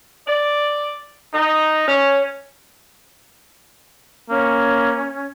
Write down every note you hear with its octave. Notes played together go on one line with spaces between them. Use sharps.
D5
D#4
C#4
A#3 C#4